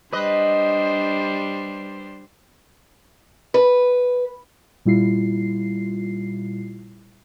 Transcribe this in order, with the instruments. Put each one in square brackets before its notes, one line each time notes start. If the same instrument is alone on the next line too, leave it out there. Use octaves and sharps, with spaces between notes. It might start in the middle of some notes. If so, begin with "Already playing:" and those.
[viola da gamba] G3 D4 C5 [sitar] B4 D#5
[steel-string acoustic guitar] B4
[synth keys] A#2 G3 E4 F4 C7